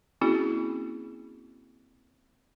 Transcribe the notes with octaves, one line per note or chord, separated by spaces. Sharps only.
A#3 C4 C#4 E4 F#4 G#4